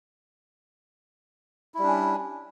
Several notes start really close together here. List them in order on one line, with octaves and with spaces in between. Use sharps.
E4 G3 D4 C#4